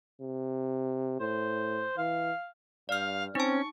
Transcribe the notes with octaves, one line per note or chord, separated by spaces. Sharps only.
C3
A2 C5
E3 F5
G2 D5 F5 F6
C4 C#4 D#4 A5 C#6